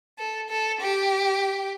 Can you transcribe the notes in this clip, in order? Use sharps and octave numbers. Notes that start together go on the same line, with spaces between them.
A4
A4
G4